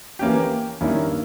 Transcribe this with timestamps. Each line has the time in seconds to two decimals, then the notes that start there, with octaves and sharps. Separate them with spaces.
0.19 E3 A#3 C#4 G4
0.81 G2 D#3 A#3 C#4 E4